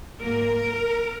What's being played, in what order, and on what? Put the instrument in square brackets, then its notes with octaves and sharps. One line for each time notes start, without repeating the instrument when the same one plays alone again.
[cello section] G#2 F#3 A#3 A#4